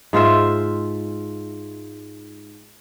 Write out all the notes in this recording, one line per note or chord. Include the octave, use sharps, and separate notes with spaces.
G#2 F4 C5 E5